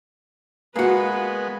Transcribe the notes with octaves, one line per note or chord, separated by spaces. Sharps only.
G#3 A#3 B3 F#4 B4